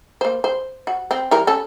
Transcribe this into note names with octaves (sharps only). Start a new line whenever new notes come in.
A#3 C5
C5
F#4
C4
E3 G3 A#4
C#4 A4